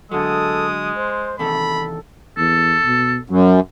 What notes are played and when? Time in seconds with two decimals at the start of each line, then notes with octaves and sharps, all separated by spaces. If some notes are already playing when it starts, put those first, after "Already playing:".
0.12 D3 F#3 G#3 A4 D#6
0.96 C5
1.39 E2 C3 D#3 A4 B5
2.37 E2 A4
2.84 B2
3.30 F#2 F#3